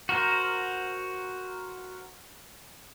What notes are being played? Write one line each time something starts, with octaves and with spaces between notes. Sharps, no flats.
F#4 A#4 C5